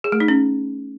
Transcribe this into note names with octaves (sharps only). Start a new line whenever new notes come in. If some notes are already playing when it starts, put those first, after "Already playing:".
G#4
A3
D#4
C#4